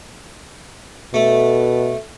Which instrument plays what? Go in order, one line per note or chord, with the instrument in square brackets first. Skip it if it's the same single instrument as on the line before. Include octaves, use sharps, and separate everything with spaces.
[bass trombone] B2 [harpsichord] A3